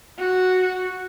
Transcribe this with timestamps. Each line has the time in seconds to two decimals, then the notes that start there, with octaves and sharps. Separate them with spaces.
0.18 F#4